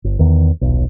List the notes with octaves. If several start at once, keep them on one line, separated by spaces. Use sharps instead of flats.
G1
E2 D#3
D#1 B1